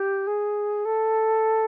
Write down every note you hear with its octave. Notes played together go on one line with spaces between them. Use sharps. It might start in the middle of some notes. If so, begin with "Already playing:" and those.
Already playing: G4
G#4
A4